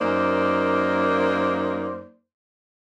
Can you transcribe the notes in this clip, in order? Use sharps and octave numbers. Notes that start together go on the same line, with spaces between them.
F#2 A#3 D#4 C5 D5